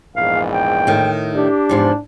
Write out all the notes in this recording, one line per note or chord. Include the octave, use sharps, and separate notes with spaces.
A#1 E2 G#2 F5
G5
A2 D#3
D4 G4
E2 G#2 F3